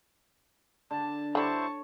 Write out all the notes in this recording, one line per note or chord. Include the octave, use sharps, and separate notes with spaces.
D3 A5
D3 G3 E4 C5 C#5 A5 C#6